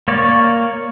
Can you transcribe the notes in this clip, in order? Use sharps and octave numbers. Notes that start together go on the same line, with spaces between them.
A#3 C#5 D5